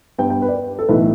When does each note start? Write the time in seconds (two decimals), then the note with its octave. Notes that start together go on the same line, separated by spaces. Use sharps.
0.18 G2 G3 B3 G5
0.30 G5
0.42 B4
0.49 D5
0.54 B4
0.79 A4
0.89 B1 A2 E3 A3 B4